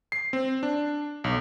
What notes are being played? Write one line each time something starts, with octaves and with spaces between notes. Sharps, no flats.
C7
C4
D4
B1